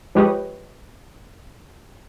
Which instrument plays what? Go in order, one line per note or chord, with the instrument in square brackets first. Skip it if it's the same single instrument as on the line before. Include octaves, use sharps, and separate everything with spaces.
[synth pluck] F3 G#3 G4 B4 C#5 D#5